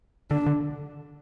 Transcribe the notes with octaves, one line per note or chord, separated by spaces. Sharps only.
D3 D4
D3